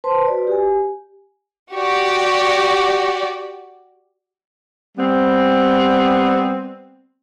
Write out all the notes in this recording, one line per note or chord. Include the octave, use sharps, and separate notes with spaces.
B4 C5 A5 C6
F#4 B4 D5
G4 G#5
F#4 G4 D5
G3 B3 C4